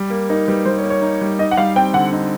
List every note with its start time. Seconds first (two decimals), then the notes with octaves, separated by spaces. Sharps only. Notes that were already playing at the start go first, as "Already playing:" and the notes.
Already playing: G3
0.10 A#3
0.29 D#4 A#4
0.47 G3 B4
0.65 G3 C5
0.78 C#5
0.84 A#3
0.90 C#5
1.02 D#4
1.21 G3
1.39 D#4 D#5
1.51 F#5
1.57 G3 F5
1.76 C4 G5
1.94 D3 F#5
2.13 D#4